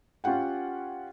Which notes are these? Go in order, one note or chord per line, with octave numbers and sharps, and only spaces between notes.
C#4 F4 G4 F#5 G5